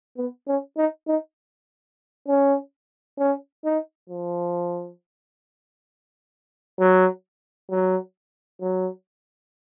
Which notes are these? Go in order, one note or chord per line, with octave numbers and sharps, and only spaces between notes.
B3
C#4
D#4
D#4
C#4
C#4
D#4
F3
F#3
F#3
F#3